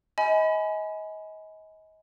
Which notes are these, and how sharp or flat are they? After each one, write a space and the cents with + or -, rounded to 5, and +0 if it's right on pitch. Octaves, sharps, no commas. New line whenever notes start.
D#5 +30 G#5 +15 B5 +15